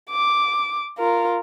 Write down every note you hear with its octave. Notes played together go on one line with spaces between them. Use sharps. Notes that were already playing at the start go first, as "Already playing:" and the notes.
D6
F4 A#4